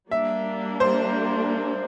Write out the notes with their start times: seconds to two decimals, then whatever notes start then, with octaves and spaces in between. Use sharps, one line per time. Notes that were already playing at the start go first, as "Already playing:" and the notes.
0.11 G3 A#3 D4 E5
0.80 C5